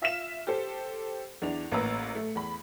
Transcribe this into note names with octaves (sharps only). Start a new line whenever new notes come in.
F4 E5 F6 B6 E7
G4 A4 C5
E2 D4 E4 F7
A1 A#3 B4 A#5 E6
A3
E2 B5